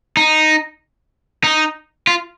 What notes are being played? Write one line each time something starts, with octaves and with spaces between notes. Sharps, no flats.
D#4
D#4
F4